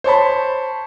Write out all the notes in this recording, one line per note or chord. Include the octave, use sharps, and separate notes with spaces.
C5 C#5 A5 B5